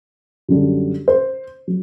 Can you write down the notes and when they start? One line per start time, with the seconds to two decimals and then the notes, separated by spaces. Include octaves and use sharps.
0.48 F#2 D3 G3
1.08 C5
1.67 F#3